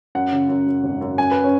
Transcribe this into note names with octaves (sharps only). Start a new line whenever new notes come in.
F#2 F#5
C#3
F#2
F#2
G#1
F#2
F#2 G#5
B4
C#4